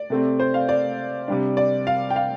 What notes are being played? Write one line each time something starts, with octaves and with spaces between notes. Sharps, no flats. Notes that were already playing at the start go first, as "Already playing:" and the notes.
Already playing: D5
C3 A3 C4
C5
F5
D5
C3 G3 D4
D5
F5
G5
F5